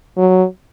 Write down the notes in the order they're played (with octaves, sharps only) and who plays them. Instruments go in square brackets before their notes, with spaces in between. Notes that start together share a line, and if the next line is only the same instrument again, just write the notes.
[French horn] F#3